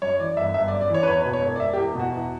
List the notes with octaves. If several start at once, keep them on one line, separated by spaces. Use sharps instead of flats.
F#2 C#5
E3 D5
G1 E5
G1 E5
D5
F#2
D5
E3 C#5
B4
E2 C#5
B4
B2
C#5
E1
D5
E1 E5
E2 G4
B2 F#4
E2